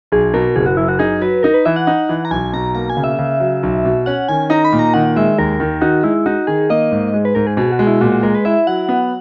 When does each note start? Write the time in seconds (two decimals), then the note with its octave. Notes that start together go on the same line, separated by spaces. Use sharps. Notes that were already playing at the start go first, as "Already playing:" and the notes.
0.12 B1 G#4
0.34 B2 A#4
0.56 F#1 G#4
0.66 F#4
0.77 F#2 E4
0.88 F#4
0.99 D#4 G#4
1.21 F#3 B4
1.43 D#4 A#4
1.54 B4
1.65 E3 E5
1.76 F#5
1.87 D#4
2.09 E3
2.25 A#5
2.31 B1 G#5
2.53 B2 A#5
2.75 A#3 A#5
2.90 G#5
2.97 C#3
3.04 E5
3.19 C#3
3.40 F#3
3.63 B1
3.85 B2
4.06 C#4 F#5
4.29 D#3 G#5
4.50 D#4 A#5
4.65 B5
4.73 A#2
4.79 A#5
4.94 D#3 F#5
5.16 G#3 E5
5.38 D#2 A#4
5.60 D#3
5.81 D#4 F#4
6.03 G#3 E4
6.26 D#4 F#4
6.47 D#3 G#4
6.70 A#3 D#5
6.92 G#2
7.14 G#3
7.25 B4
7.35 G#2 A#4
7.47 G#4
7.57 B2 G#4
7.72 F#4
7.79 G#3
7.87 E4
8.01 A#2 F#4
8.12 F#4
8.23 G#3 A#4
8.35 B4
8.45 E4 E5
8.67 F#3 F#5
8.89 B3